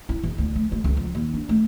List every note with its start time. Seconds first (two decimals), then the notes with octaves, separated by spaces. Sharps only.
0.09 E4
0.23 E2
0.38 D2
0.55 A3
0.72 A3
0.84 C#2
0.97 F2
1.15 D#2
1.34 D4
1.49 A3